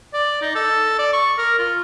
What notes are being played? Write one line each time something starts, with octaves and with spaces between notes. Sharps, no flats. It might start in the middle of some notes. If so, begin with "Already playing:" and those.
D5
D#4
A4
D5
C#6
A#4
F4